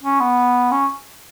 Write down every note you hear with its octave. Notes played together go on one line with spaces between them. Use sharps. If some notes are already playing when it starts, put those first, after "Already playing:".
C#4
B3
C#4